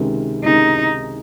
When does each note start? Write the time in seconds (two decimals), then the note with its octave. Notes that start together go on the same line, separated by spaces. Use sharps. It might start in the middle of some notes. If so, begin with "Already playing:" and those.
Already playing: C#2 C3 D#3 G#3
0.44 C#2 C3 D#3 G#3 D#4